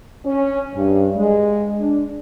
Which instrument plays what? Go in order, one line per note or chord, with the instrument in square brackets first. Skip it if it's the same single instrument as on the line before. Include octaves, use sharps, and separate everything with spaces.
[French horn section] C#4
G2
G#3
D4